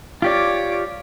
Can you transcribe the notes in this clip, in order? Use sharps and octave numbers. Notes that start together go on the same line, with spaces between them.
F4 G4 C#5 D5 D6